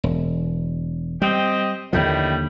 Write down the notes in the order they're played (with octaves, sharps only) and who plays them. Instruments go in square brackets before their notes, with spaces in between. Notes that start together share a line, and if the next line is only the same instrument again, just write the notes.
[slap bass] E1
[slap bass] G3 [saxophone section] C4 G4 D#5
[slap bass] D#2 D3 F3 [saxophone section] A2 D#3 G3